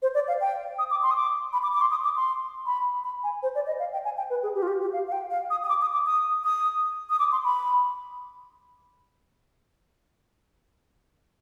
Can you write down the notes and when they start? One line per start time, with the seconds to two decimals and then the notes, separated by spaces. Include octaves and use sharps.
0.02 C5
0.15 D5
0.28 F5
0.41 G5
0.79 D#6
0.91 D6
1.03 C6
1.11 D#6
1.16 D6
1.53 B5
1.63 D6
1.73 D6
1.81 C6
1.91 D#6
2.04 D6
2.16 C6
2.66 B5
3.04 B5
3.24 G#5
3.43 C5
3.55 D5
3.67 D#5
3.79 F5
3.93 G5
4.04 G#5
4.18 G5
4.30 B4
4.43 G#4
4.55 G4
4.62 F4
4.68 G4
4.81 G4
4.93 F5
5.07 F5
5.12 G5
5.31 F5
5.50 D#6
5.64 D#6
5.69 D6
5.82 D#6
5.93 D6
6.06 D#6
6.44 D#6
7.10 D#6
7.19 D6
7.32 C6
7.44 B5